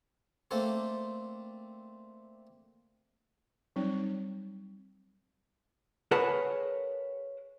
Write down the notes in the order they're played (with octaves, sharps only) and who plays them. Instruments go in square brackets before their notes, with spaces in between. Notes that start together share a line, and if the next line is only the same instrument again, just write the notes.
[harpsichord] A3 A#3 C4 D4 A4 C5
[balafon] F#3 G3 C4 D#4
[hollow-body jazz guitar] G#4 A#4 B4 C#5 F#5 A5